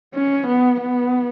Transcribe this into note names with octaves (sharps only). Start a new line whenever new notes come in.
C#4
B3
B3